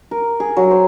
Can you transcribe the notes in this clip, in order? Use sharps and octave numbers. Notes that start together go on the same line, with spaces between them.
A#4
G#4
F#3
C5